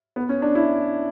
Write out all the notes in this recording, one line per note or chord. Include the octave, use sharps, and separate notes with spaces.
B3
C#4
D4
E4